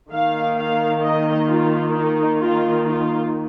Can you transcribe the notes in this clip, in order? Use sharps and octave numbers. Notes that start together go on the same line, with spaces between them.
D#3 A#3 F5
F5
D#5
F4
D#4
F4
F4